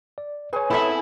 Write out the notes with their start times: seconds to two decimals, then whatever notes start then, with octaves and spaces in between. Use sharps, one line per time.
0.18 D5
0.53 G#4 B4 C#5 G#5
0.71 B3 C4 E4 A4 E5 B5